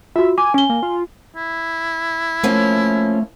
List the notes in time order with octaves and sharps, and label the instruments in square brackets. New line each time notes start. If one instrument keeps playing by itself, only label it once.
[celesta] F4 F#4 [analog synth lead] E5
[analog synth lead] G#5 [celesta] D6
[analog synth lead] C#4 [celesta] G#5 G7
[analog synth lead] A#3
F4
[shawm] E4
[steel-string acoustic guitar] F3 A#3 C#4 [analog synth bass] A3